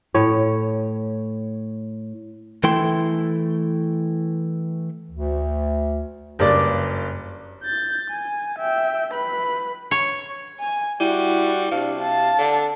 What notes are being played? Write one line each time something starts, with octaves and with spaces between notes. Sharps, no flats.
A2 C#5
E3 A3 E4 A4 G5 C6
D2
F#1 G2 D5 D6 A6
G6 A6
G#5
E5 G5
B4 B5
C#5
G#5
G3 E4 F#4
C3 D4 F5
A5
D3